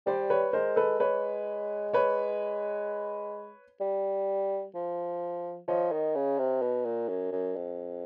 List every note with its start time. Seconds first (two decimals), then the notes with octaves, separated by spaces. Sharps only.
0.06 G3 C5 D5
0.30 B4 C#5
0.53 G#3 A#4 C5
0.76 A4 B4
1.00 G#3 B4 C#5
1.93 B4 C#5
3.81 G3
4.75 F3
5.68 F3 C#5 D#5
5.92 D#3
6.15 C#3
6.39 C3
6.62 B2
6.85 A#2
7.08 F#2
7.32 F#2
7.56 F2